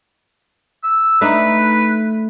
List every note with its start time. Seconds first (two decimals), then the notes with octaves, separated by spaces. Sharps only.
0.83 E6
1.21 A3 D4 D#4 B4